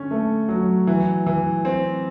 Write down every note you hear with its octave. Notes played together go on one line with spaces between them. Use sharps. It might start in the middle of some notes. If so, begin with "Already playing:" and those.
Already playing: D3 C#4
A3
F#3
E3
E3
C4